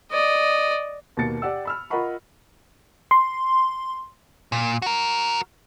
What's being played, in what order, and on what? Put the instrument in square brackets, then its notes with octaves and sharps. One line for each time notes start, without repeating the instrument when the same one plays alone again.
[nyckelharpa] D5 D#5
[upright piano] D#2 B2 A#3 A6 C#7
G4 D5 F#5 G5 E6
B5 E6 F6
F4 A#4 D#5 F#5 B5 C#6
[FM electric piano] C6
[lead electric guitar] A#2
F#4 A#4